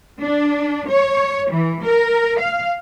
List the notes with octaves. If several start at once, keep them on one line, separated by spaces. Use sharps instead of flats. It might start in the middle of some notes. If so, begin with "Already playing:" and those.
D4
C#5
E3
A#4
F5